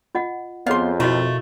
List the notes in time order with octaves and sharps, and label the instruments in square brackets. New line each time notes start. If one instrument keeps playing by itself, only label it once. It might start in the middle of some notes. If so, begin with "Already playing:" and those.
[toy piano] F4 D#5 F#5
[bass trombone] F2 [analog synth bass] B3 [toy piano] G#4 C#5 D#5 [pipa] F5 C6
[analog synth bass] B2 [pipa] A3 A#3 [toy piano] E4 F#4 D#5